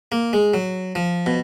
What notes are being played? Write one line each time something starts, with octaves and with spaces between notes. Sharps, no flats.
A#3
G#3
F#3
F3
B2